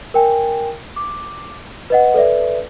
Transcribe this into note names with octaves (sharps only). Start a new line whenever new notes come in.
A#4 G5 G#5
D6
B4 D#5 F#5
A4 B4 D5 E5